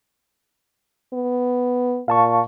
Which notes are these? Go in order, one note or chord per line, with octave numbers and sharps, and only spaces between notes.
B3
A#2 F5 A5 C#6